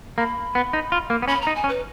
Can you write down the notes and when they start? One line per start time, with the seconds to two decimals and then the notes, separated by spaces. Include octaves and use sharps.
0.18 A#3 B5
0.55 B3
0.73 D#4
0.92 F4
1.10 A#3
1.22 B3
1.28 C#4 B5
1.42 A#5
1.47 D#4
1.56 G#5
1.64 C#4
1.69 B4